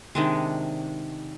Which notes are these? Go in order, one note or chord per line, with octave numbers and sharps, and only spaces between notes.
C3 D#3 G#3 D4